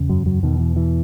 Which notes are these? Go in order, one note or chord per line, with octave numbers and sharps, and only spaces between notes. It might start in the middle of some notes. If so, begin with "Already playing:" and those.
Already playing: E2 C#3
F#2 F#3
F#2 F#3
E2 B2 D#3
E3
E3